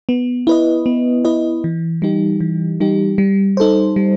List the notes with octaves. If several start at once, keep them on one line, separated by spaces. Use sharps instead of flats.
B3
E4 B4 D#5
B3
E4 B4 D#5
E3
G3 D#4 G4
E3
G3 D#4 G4
G3
D#4 A4 C5
G3